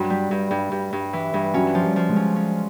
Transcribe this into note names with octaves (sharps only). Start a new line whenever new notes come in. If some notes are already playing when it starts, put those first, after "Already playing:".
Already playing: G2 F#3
G3
G2
G2
G2
G2
E3
G2
F#3 C#4
F3
G3
F3
G#3
C#4
C#4